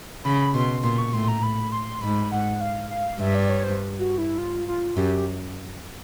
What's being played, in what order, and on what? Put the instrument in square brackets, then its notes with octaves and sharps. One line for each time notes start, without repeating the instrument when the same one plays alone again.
[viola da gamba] C#3 [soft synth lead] B5
[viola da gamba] B2 [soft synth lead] C6
[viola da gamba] A#2 [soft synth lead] C6
[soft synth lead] C#6
[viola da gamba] A2 [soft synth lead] C6
[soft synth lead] A#5
B5
C6
[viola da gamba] G#2 [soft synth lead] B5
[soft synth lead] F#5
F5
F5
[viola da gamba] G2 [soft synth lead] E5
[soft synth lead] D5
C#5
C5
F#4
E4
F4
F4
[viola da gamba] F#2 [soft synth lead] G4